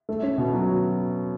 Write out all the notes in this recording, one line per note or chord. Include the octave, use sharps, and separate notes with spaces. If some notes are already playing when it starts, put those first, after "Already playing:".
A3
C#4
B2
F#3